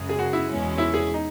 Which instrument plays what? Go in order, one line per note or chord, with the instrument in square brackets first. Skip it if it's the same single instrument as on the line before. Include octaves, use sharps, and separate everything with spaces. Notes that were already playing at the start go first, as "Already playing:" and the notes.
Already playing: [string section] F#2 C#3 G#3
[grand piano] G#4
F#4
E4
[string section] E2 B2 G#3 C#4
[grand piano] E4
G#4
D#4